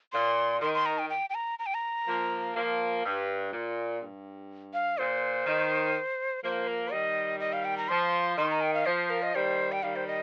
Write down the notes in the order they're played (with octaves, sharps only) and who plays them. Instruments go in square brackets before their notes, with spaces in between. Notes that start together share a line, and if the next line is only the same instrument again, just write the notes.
[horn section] A#2 [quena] C6
[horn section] D#3 [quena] C6
[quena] C6
A#5
G5
G5
G5
A#5
A#5
G5
A#5
[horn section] F3 A#3
F3 A#3
G2
A#2
G2
[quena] F5
[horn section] A#2 [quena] C5
[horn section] D#3
[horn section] F3 A#3 [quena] C5
[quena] A#4
[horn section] D#3 G3 [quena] D#5
[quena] D#5
F5
G5
A#5
[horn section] F3 [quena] C6
[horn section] D#3 [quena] C6
[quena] A#5
G5
F5
[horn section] F3 [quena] C5
[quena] A#4
D#5
[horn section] D#3 G3 [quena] C5
[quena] G5
[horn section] D#3 G3 [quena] F5
[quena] C5
D#5